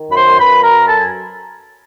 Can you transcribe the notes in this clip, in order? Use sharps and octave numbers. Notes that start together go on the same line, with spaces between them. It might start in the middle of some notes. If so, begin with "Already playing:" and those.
Already playing: D#3
F#2 B5
C5 C6
F#2 B4 B5
A#4 A#5
F#3
A4 A5
G#5